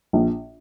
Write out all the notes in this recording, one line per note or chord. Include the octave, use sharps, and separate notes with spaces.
A#1